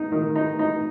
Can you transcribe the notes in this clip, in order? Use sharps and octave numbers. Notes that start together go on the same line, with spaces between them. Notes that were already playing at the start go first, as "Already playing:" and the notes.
Already playing: D#4
D#3
D#4
D#4